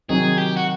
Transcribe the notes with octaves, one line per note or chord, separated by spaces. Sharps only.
C3 D#3 F#3 G#4
G4
F#4